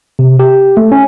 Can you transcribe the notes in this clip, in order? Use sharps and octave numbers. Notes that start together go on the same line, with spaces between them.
C3
G4
A3
C#4